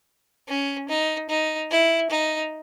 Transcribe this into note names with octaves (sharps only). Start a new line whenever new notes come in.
C#4
D#4
D#4
E4
D#4